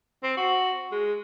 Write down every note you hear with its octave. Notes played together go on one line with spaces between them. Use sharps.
C4
F#4
G#3